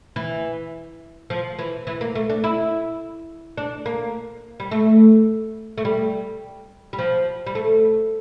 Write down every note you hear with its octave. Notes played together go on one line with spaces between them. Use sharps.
E3
F3
E3
E3
A#3
A3
D4
E4
D4
A#3
G3
A3
A3
G3
G3
F3
G3
A3